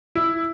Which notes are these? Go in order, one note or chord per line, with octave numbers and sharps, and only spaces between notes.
E4